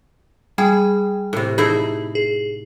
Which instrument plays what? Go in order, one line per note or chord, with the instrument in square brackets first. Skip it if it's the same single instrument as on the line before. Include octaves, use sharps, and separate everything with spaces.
[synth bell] G3 G5 [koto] G#4
[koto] A2 C3
[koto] D#4 E4 A4 [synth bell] G#4
[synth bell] G#4